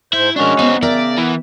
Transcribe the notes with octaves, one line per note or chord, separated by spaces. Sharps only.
G#2 E4 C5
G#3 C#4 D4 F#4 A#4
B3 C4 D#4
C#3 A#4 D5 E5 G5
E3 B3